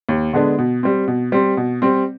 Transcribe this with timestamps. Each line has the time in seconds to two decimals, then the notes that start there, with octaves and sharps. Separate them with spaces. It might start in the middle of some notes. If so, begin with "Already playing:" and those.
0.09 D#2
0.33 D3 G#3 B3 D4
0.59 B2
0.83 G3 C4
1.08 B2
1.32 G3 C4
1.57 B2
1.82 G3 C4